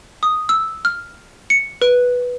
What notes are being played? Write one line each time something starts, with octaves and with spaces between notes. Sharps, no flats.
D#6
E6
F6
C#7
B4